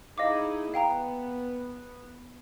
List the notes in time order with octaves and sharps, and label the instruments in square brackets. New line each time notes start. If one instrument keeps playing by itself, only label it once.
[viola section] D#4 E4 G#4 [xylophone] D#5 F5 D6
[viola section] B3 [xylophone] F5 G5 A#5